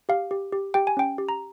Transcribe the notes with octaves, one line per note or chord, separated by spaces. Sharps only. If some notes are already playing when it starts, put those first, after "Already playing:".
G4 F5
G4
G4
G4 G5
G#5
C#4 G5
G4
A#5